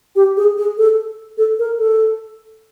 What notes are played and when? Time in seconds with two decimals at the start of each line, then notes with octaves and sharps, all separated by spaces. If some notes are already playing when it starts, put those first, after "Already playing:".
0.16 G4
0.37 G#4
0.57 G#4
0.78 A4
1.38 A4
1.59 A#4
1.79 A4